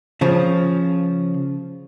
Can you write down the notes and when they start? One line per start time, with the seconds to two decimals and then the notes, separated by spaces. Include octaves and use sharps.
0.21 C#3 F3